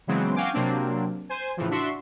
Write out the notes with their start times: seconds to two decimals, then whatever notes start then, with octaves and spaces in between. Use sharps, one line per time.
0.07 C#3 E3 F#3 G#3 B3 C4
0.36 F#4 F5 G5 G#5 D6
0.53 C3 F#3 A#3 C4 D4
1.29 C5 G#5
1.57 A2 C#3 E3 F3
1.70 D4 F#4 E5 C6 C#6